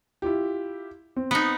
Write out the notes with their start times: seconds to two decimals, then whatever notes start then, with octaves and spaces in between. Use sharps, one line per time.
0.22 E4 F4 G4
1.16 C4
1.31 B3 D#4